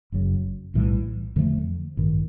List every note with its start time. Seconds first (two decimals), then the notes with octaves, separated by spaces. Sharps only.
0.12 F#1 F#2 C#3 F#3
0.74 B1 A2 E3 G3
1.36 F2 D3 F3 A3
1.97 A1 G2 D#3